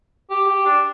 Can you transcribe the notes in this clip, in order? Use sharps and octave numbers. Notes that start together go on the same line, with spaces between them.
G4
G4
D4